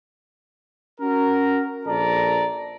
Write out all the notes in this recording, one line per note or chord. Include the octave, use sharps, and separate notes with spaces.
C#4 F#4 A#4
A#1 A4 D5 A#5